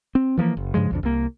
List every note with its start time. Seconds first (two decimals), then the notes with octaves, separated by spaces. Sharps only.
0.15 C4
0.38 E3 F3 A3 A#3
0.57 F#1
0.74 G2 C#3 F3 G#3
0.91 B1 F2 D3
1.03 C2 A#3